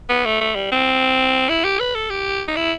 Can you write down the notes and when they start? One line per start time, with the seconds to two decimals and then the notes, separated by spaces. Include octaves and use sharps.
0.09 B3
0.25 A3
0.41 A3
0.55 G3
0.72 C4
1.49 E4
1.64 G4
1.80 B4
1.95 A4
2.10 G4
2.48 D#4
2.56 E4